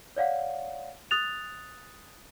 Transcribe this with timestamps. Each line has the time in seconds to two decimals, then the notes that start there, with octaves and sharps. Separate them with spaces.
0.16 C#5 D5 F5 F#5
1.11 D#6 F#6 A6 F7